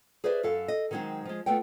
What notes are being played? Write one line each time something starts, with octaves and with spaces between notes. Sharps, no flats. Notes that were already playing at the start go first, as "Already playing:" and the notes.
G#4 B4 C5 D5 E5
F#2 A4 F5
D#5
D#3 F#3 G#3 C4 D#4
F3 G#3
A3 B3 F4 G5